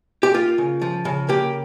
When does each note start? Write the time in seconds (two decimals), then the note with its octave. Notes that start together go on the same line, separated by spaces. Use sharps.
0.23 G4
0.34 A#3 F4
0.58 C#3
0.82 F3
1.05 C#3
1.29 A#3 G4